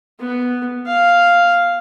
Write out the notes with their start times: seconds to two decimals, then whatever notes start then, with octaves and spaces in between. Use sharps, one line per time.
0.20 B3
0.87 F5